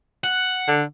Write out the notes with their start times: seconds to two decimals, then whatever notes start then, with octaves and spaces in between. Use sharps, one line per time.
0.24 F#5
0.68 D3